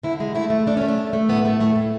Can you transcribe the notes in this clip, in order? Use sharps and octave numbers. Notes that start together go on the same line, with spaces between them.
D3 E4
G#3
A3 E4
A3
A3 D4
A3 C#4
D4
A3
A3
A2 B3
A3
A2 A3
A2